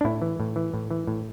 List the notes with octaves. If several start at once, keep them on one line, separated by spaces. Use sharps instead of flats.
D4
A2 E4
E3
A2
E3
A2
E3
A2